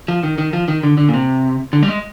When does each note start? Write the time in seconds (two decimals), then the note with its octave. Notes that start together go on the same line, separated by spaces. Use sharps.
0.08 F3
0.23 D#3
0.38 D#3
0.53 F3
0.68 D#3
0.83 D3
0.98 D3
1.09 A#2
1.14 C3
1.73 D3
1.82 G3
1.88 G#3